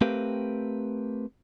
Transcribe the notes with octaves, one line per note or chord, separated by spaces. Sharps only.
A3 C4 G4 A#4 B4 F5